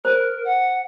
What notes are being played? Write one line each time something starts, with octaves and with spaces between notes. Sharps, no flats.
A#4 C5
F#5